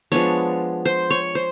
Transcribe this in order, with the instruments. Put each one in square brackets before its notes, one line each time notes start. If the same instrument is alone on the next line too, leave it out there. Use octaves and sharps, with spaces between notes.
[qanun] F3 G#3 B3 D4 C#5
C5
C#5
C5